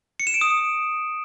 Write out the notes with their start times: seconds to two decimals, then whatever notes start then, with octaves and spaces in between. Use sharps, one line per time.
0.20 C#7
0.27 E7
0.34 D7
0.41 D#6